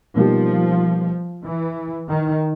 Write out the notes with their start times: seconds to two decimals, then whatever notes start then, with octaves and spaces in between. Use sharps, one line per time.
0.15 B2 F3 G3 A#3 D#4 G4
1.45 E3
2.10 D#3